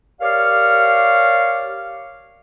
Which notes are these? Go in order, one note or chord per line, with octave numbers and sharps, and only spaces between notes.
G4 A#4 C#5 D5 F5